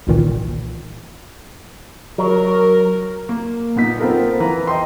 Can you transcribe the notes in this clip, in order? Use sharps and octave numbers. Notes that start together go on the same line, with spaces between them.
G1 C2 A#2 D#3 E3
F#3 A#4
A#3
A#2 B3 D#4 B6
B3 C4 F4 A4 A#4
E3 B4 A#5
D#5 G5 C6